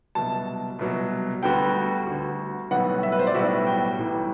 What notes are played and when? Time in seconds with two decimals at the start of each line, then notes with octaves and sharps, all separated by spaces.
0.15 C2 B2 F#3 A5
0.79 C2 B2 F#3
1.43 D2 D3 G3 B3 F#4 G5
2.07 D2 D3 G3 B3 F#4
2.71 B1 A2 G3 B3 F#4 F#5
3.03 E5
3.12 B4
3.19 C5
3.27 D5
3.35 B1 A2 G3 B3 F#4 E5
3.67 G5
3.98 A1 A2 E3 G3